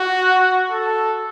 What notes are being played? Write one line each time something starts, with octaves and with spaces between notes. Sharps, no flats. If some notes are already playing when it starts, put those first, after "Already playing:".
Already playing: F#4
A4